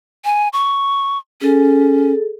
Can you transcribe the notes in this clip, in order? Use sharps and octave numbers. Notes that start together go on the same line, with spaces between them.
G#5
C#6
C#4 G#4 A4